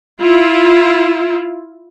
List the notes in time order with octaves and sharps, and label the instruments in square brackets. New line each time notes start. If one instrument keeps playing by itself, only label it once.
[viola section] E4 F4